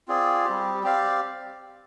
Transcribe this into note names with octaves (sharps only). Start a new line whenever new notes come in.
C4 F4 G#4 D5
G3 C4 G4
C4 G4 D5 F5